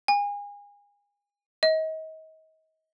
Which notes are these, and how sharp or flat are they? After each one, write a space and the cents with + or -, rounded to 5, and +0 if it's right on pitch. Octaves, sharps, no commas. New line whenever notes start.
G#5 -30
D#5 +35